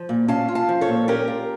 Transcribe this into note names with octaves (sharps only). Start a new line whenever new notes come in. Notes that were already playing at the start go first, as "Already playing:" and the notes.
Already playing: F3
A#2
C#4 F5 A5
F4
F5 A5
F3
A4 C#5
A#2
C#4 G4 A#4
F4